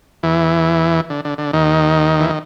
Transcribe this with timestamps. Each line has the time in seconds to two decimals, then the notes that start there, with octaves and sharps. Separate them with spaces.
0.23 E2 E3
1.10 D3
1.25 D3
1.38 D3
1.53 D#2 D#3
2.20 E3
2.30 D#3